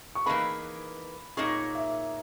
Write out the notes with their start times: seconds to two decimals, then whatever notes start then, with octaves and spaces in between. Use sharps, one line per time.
0.15 C#6
0.26 E3 A#3 D#4 G#4 B4 B5
1.37 A#2 A#3 D#4 G#4 C#5 C#6
1.75 E5